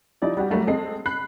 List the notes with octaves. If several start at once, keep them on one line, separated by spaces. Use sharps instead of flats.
F3 D#4 E4 G4 D5
G3 F#4 G4
F#3 G3 A3 A#3
G#3 C4 A4 D#5 C7
B5 F#6 C7